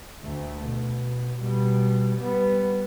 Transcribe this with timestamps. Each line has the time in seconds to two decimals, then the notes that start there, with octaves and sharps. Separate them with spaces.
0.23 D2 A3
0.66 B2
1.39 B2 G3
2.17 G3 B3